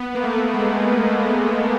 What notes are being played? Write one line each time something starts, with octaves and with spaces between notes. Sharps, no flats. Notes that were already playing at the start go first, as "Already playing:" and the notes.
Already playing: B3
A#3
A3
G#3